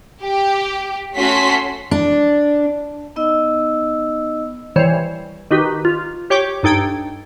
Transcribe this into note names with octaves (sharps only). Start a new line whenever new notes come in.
G4
A3 C#4 F#4 C6 B6
D4
B3 D#4 D#5 E6
E3 G3 C5 C#5
D#3 D#4 F#4 G4 B4
F4
G4 C#5 G5 C#6 D6 G6
G2 D#4 A4 G5 G#6 D7